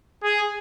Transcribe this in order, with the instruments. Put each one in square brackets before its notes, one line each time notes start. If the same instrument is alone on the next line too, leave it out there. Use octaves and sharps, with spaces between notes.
[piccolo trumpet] G#4